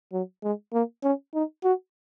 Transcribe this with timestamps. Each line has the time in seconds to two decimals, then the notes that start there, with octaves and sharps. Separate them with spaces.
0.12 F#3
0.43 G#3
0.73 A#3
1.03 C#4
1.34 D#4
1.64 F#4